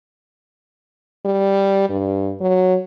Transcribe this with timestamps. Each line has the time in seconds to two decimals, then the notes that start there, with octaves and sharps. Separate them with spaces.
1.26 G3
1.89 G2
2.41 F#3